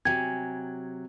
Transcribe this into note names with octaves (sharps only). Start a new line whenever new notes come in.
C3 F#3 G4 G#5 G#6